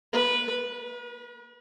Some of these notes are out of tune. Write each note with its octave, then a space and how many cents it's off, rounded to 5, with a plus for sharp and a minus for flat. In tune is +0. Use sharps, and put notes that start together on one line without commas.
B4 -10
B4 -45